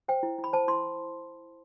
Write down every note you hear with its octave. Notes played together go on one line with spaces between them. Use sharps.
C5 G5
E4
E4
B5
C5 A5
E4 C6